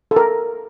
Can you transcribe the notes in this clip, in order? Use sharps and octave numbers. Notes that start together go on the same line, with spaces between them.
A4
A#4